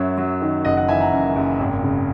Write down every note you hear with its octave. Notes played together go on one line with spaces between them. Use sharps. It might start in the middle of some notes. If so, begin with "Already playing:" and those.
Already playing: F#2 F#3 C#5 E5
F#3
D#3
F#1 D#5 F#5
D#5 F#5
E3 E5 G#5
F#5 A#5
F#2
F#1
G#1
C#3